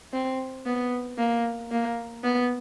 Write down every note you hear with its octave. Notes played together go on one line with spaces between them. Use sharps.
C4
B3
A#3
A#3
B3